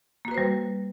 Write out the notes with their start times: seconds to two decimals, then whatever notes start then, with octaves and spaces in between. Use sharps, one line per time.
0.25 A#3
0.28 F#4
0.31 B4
0.34 C5
0.38 G3